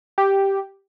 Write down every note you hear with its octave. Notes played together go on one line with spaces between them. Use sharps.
G4